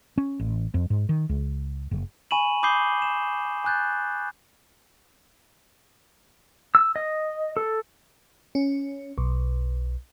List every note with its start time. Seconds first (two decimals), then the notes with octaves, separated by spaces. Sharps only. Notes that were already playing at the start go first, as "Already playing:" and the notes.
0.18 C#4
0.39 A1
0.74 F2
0.90 G#2
1.09 D#3
1.29 C#2
1.91 F#1
2.31 G#5 B5 C#6 D#7 E7 F#7
2.63 B5 D6 D#6 G6 C7 G7
3.02 E7
3.64 G#5 D6 F#6 G6 A6
6.75 E6
6.96 D#5
7.57 A4
8.55 C#4
9.18 B1